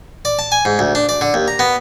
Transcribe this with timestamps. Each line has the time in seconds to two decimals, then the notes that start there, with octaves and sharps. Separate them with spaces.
0.25 D5
0.39 A5
0.52 G#5
0.65 G#2
0.79 D2
0.95 D4
1.09 D5
1.21 D3
1.34 D#2
1.48 A#5
1.59 B3